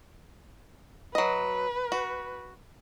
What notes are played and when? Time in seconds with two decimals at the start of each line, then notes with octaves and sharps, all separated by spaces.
1.15 F#3 B4 D#5
1.92 F#4